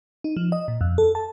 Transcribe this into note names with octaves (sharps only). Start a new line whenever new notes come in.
D#4
F3
D#5
A#2
F2
A4
A5